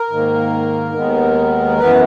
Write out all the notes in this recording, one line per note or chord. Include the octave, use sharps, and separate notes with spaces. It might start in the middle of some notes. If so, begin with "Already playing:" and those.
Already playing: A#4
G#2 D#3 A#3
D#2 D#3 G#3 B3
F#2 E3 B3 B4